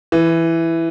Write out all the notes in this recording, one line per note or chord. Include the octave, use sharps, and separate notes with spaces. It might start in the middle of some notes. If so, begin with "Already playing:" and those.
E3